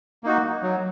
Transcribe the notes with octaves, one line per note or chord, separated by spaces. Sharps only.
A#3 D#4 F#4
F#3